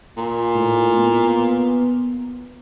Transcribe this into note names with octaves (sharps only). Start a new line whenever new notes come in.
A#2
A2
B3